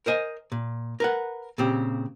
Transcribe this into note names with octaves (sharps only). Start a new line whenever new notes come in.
A#4 C5 D#5 G#5
A#2
A#4 B4 F#5
A#2 C#3 C4 G4